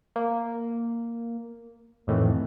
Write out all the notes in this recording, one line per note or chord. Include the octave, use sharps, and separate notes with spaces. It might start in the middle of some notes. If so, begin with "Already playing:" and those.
A#3
F2 A2 D#3 E3